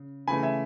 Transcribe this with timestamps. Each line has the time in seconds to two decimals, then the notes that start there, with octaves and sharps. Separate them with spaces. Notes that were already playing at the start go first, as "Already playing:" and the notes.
Already playing: C#3
0.28 C#3 E3 A3 G#5 B5
0.43 E5 G#5